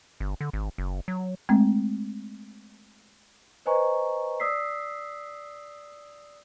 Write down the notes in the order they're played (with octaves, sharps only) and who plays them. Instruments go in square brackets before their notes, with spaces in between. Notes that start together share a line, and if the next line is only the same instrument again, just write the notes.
[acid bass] G1
D3
G#1
F#1
F#3
[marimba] G#3 A3 C4
[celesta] B4 C5 D#5 G#5 A#5 C#6
D5 D#6 E6 B6 C7